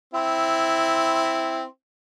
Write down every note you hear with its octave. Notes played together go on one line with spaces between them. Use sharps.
C4 E4